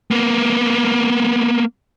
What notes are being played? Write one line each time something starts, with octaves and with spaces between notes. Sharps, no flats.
A#3 B3